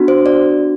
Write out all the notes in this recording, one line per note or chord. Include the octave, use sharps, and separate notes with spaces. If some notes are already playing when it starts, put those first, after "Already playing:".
Already playing: B3 D4 F#4
C5
D5